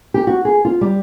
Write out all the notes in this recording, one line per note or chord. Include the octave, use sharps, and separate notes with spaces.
G4
F#4
G#4
F4
G3